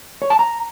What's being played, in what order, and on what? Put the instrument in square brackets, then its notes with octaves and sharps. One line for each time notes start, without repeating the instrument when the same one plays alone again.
[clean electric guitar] C#5
A5
A#5